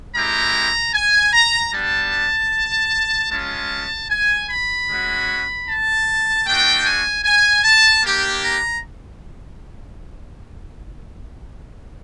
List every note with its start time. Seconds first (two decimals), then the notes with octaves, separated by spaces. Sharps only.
0.15 G#3 C4 E4 G4 A#5
0.94 G#5
1.33 A#5
1.73 G3 B3 D4 A5
3.31 G#3 C#4 F4 A5
4.10 G#5
4.49 B5
4.88 G#3 C#4 F#4
5.67 A5
6.46 A3 D4 F#4 G5
6.85 G#5
7.24 G#5
7.64 A5
8.03 A#3 D4 G4
8.43 A#5